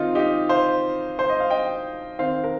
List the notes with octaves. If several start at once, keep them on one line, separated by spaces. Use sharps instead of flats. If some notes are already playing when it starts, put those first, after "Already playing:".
Already playing: D#3 C4 D#4 F4
D#4 G4
C5 F5
C5
D#5
F5
D#5 G5
D#3 C4 C5 F5
A#4